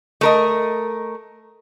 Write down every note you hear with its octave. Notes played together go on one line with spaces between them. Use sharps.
A3 A#4 D#5